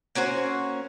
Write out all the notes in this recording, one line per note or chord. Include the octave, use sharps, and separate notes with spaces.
A#3 C#4 F#4 C5